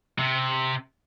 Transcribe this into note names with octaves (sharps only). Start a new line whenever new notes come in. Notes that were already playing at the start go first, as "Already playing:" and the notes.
C3